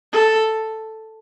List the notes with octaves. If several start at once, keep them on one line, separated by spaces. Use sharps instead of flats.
A4